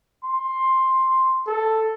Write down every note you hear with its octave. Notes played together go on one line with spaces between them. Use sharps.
C6
A4